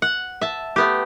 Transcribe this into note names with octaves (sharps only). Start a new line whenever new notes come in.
F#5
E5 A5
A3 B3 G4